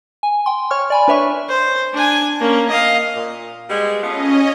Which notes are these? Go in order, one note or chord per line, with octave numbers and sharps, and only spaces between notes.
G#5
G5 C6
C#5 C#6 F6
D5 G#5 B5
D4 B4 C#5 E5 G#5 C#6
C5
D4 G#5
A#3 C#4
D#5 F5
A#2
G3 G#3 B3
A3 B3 C#4 F4 D#5